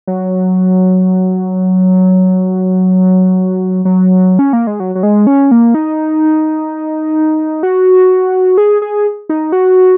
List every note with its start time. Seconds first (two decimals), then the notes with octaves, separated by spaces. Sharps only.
0.07 F#3
3.85 F#3
4.39 C#4
4.53 A#3
4.67 G#3
4.80 F#3
4.95 F#3
5.03 G#3
5.27 C#4
5.51 A#3
5.74 D#4
7.63 F#4
8.58 G#4
8.82 G#4
9.29 D#4
9.52 F#4